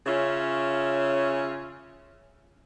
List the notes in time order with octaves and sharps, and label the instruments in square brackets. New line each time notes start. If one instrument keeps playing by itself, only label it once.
[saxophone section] C#3 C#4 F4 E5